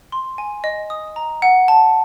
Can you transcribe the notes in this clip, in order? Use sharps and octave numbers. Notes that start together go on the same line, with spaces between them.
C6
G#5
D#5
D#6
A#5
F#5
A5